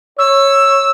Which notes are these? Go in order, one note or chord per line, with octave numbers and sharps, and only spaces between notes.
C#5 E6